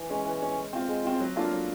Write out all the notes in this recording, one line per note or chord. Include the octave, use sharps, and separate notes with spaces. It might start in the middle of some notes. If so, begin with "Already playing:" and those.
Already playing: E3
G#3 C#4
E3
G#3 C#4
G#3
C4 F4
G#3
C4 F4
F#3
A#3 D4 F4 A4
F#3